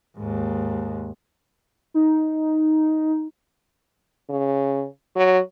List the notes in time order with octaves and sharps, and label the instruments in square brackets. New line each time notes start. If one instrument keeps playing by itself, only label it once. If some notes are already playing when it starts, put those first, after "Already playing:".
[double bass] D#2 G#2
[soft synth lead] D#4
[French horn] C#3
F#3